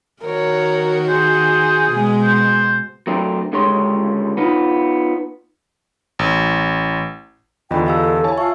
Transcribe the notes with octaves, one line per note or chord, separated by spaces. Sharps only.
D#3 F#4 A#4 C#5
G#4 C5
B2 G#3
C5
F#3 A3 C4 D4 A#4
C#2 D3 G3 G#3 C#5 C6
B3 D#4 F4
A1
E2 D3 F4 D#5 G5 B5
G4 A4 F5 E6
E4 C#5 G#5 A5
F4 E5 C#6 E6